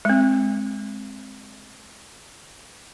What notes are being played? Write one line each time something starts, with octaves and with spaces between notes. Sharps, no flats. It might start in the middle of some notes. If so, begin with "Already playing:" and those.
G#3 C4